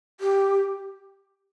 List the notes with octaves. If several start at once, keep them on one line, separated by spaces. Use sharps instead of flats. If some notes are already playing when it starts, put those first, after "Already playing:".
G4